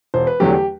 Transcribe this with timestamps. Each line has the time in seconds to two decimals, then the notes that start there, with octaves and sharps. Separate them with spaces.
0.14 E1 C5
0.27 B4
0.40 E2 D3 F#3 A3 G4
0.53 G4